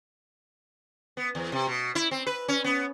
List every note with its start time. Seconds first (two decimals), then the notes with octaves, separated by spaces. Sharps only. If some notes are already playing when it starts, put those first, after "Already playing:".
1.17 B3
1.35 E2
1.52 C3
1.67 B2
1.95 E4
2.11 C4
2.27 B4
2.48 C#4
2.64 B3